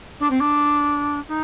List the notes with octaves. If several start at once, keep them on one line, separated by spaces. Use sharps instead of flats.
D4
C4
D4
D#4